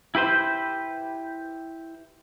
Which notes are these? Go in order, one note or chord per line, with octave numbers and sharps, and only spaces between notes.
E4 G4 B4 C5